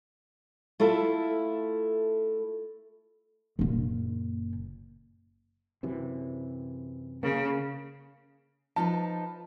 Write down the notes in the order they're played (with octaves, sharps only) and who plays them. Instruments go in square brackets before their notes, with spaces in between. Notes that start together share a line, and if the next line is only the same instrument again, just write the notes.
[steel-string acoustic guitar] A3 E4 F4 A4
[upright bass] F#1 A#2
[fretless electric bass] F#2 C3 E3
[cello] C#3 [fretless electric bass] A#3
[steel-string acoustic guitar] F3 D#4 B4 [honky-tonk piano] A5